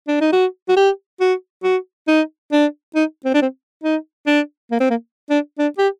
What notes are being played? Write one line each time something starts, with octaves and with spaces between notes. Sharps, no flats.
D4
D#4
F#4
F#4
G4
F#4
F#4
D#4
D4
D#4
C4
D4
C4
D#4
D4
A#3
C4
A#3
D4
D4
G4